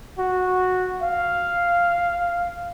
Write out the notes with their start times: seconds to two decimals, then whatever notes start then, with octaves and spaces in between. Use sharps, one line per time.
0.19 F#4
1.02 F5